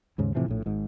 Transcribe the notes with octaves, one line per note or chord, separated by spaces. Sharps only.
D#2 G#2 C#3
A2 C3 E3 F3
A#1 A2
G#1 G#2